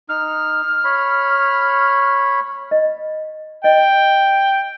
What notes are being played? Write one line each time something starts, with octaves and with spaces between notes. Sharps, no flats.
D#4 F6
C#5 B5
D#5
D#5 G5